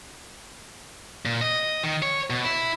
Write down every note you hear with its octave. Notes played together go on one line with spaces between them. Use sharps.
A#2
D#5
D#3
C#5
B2
E4